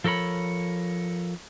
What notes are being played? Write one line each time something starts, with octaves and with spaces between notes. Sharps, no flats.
F3 A4 A#4 C#5 B5